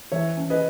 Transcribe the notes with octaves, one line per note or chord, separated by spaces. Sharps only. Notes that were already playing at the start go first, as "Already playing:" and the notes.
E3 C#5 E5
C#4
B4 D#5